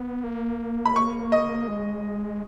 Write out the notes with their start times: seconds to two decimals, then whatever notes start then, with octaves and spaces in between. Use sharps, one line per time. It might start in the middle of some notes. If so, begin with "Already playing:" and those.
Already playing: B3
0.24 A#3
0.85 B5
0.96 C#6
1.32 D#5
1.68 G#3